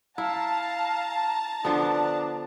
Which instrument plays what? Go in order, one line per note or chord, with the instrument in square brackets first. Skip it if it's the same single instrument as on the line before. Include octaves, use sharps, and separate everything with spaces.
[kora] E4 [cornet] F5 [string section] A5 A#5
[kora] D3 F3 B3 [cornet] D4